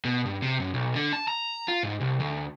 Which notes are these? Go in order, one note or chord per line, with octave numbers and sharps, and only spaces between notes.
B2
G2
C3
F#2
B1
D3
A5
A#5
F4
G#2
C2
D2